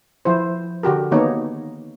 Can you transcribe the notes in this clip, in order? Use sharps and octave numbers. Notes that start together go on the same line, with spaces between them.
F3 E4 C5
D3 F#4 G4 A#4
D#3 A#3 B3 D#4 C#5